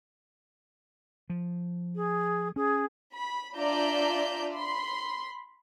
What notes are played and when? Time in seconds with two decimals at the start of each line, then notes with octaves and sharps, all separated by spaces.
1.30 F3
1.95 G#4
2.56 C#4 G#4
3.14 B5
3.56 D4 F4 D5 E5 A#5 G6
4.55 B5 C6